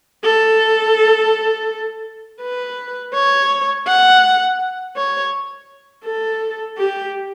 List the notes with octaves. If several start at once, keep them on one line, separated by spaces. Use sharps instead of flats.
A4
B4
C#5
F#5
C#5
A4
G4